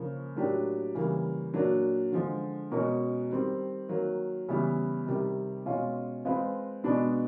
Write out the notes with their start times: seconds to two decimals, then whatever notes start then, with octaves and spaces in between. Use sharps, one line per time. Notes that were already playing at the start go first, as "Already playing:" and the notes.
Already playing: C#3 F3 A#3
0.36 A2 F#3 A#3 D4 G4
0.95 C#3 E3 G3 A#3
1.54 A#2 F#3 A#3 D4 F#4
2.12 D3 F3 G#3
2.71 B2 G#3 C#4 F#4 A#4
3.30 D#3 G3 C4
3.89 D#3 F#3 A#3
4.48 C#3 E3 G3 B3 E4
5.07 C3 D#3 G3
5.66 B2 G#3 C#4 F4
6.25 G#3 C4 F4 G#4 B4
6.84 B2 G#3 B3 D4